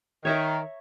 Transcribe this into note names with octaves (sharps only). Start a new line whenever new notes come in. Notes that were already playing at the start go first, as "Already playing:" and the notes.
D#3 C#5 E5 A#5